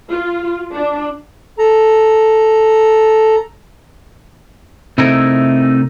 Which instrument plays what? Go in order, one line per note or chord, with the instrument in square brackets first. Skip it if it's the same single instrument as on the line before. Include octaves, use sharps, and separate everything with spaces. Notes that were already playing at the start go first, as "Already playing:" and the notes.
[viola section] F4
D4
[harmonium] A4 A#5
[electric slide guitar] C3 A3 D#4 E4 A#4